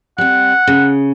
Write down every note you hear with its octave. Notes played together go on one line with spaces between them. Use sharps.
G3 C4 F#5
C#3